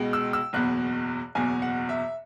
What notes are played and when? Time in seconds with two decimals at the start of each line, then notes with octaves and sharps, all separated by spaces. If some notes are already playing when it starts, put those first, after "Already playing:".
Already playing: C#2 B2 G#3
0.13 E6
0.33 E6
0.53 F#1 E2 B2 F#6
1.35 F#1 E2 B2 G#5
1.62 F#5
1.89 E5